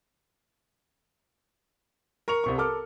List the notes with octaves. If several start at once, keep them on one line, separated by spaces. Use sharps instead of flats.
A#4 C#6 C#7 F7
C2 C3 C#6
A4 A#4 D6 F6